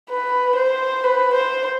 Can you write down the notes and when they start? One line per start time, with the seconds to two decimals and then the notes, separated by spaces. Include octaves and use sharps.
0.10 B4
0.56 C5
1.04 B4
1.34 C5